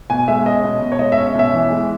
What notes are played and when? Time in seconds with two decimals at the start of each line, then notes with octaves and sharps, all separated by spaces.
0.10 B2 G#5
0.28 G#3 E5
0.46 C#4 D#5
0.64 B2
0.82 B2
0.92 C#5
0.99 G#3 D#5
1.12 E5
1.18 C#4
1.35 B2 E5
1.53 E3
1.70 G#3